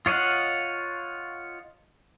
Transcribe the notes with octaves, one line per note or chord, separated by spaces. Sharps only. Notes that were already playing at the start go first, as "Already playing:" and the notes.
F4 C#5 D#5 F5 F#5